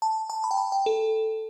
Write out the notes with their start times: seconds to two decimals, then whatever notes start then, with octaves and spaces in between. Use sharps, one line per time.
0.02 A5
0.30 A5
0.44 B5
0.51 G5
0.57 A5
0.72 G5
0.86 A4